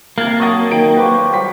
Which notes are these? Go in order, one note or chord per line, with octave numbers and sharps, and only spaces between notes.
C3 A#3 A5 F6 G#6
F#3 D#5 C#6 D#6 A6
D#3 G5 D7
F3 G4 B4 C#6
F#3 G3 C5 B6